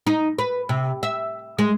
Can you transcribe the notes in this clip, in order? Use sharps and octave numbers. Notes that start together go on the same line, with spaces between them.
D#4
B4
C3
E5
G#3